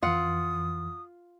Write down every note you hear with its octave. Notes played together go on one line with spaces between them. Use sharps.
F2 E3 F4 F#5 D#6